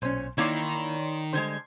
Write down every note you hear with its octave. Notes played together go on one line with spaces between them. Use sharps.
B1 A#2 C#4 C5
D#3 A#3 D#4 E4 C#5 D5 C6
D3 G3 G#3 C5 G6 G#6